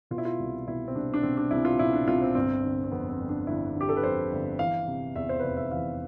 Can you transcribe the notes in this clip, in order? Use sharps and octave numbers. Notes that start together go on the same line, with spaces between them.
B2 F4
E4
F4
C2
B2 E4
C4
C2 D4
D4
B2 C4
D4
C2 E4
F4
B2 E4
D4
C2 F4
C4
G1 C4
D3
C4
F2 B3
C4
G1
D4
G1 E4
D3
G4
A4
B4
F2 C5
G1
E3 F5
C3
E2 E5
C5
B4
F1 C5
E5
E3 F5